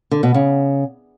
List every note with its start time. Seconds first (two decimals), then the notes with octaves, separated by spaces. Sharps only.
0.11 D3
0.23 B2
0.34 C#3